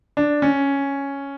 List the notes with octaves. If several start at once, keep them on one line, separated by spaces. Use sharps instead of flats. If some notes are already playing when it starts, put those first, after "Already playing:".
D4
C#4